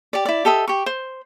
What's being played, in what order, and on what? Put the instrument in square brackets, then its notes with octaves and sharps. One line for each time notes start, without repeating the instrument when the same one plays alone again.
[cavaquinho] G4 D5
E4 D5
G4 A4 D#5 E5
G4 C#6
C5